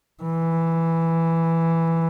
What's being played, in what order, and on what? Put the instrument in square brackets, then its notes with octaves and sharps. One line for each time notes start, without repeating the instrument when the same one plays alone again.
[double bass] E3